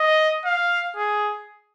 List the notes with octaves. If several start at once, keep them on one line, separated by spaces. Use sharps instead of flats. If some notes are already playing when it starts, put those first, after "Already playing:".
Already playing: D#5
F5
G#4